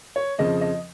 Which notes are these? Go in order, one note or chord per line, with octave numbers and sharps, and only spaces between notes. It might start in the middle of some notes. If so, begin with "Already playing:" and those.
C#5
F2 C#3 F3 D#5
D#5